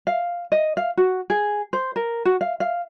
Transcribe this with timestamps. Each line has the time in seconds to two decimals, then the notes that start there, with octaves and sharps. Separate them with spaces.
0.07 F5
0.52 D#5
0.77 F5
0.97 F#4
1.30 G#4
1.73 C5
1.96 A#4
2.25 F#4
2.41 F5
2.60 F5